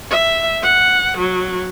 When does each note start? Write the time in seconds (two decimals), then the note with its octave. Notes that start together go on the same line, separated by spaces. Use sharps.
0.11 E5
0.62 F#5
1.18 F#3